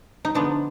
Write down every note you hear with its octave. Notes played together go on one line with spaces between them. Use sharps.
D#4
D3 F3 G#3 B3 D4